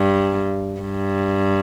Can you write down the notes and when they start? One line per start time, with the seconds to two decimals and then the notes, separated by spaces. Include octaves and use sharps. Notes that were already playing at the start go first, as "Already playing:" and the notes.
Already playing: G2
0.81 G2